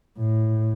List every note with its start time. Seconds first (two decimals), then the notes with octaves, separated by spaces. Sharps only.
0.18 A2